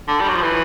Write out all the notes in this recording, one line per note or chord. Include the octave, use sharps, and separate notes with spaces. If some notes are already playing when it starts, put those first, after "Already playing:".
D3
G3
F#3
F3
E3